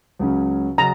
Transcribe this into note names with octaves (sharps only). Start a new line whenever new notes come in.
C#2 C#3 F#3 C#4
C#3 F#3 C#4 A#5